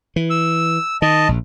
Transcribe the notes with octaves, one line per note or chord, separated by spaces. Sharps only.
E3
E6
D#3 D#5 A5
A#1